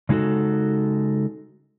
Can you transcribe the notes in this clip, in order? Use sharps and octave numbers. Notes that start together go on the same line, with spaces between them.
C#3 G#3 D#4 F#4 A4